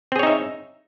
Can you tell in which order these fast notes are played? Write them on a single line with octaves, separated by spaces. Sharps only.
C4 G#4 C#5 D#4 E5